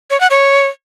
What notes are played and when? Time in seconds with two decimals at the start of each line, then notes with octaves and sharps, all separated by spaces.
0.10 C#5
0.20 F#5
0.30 C#5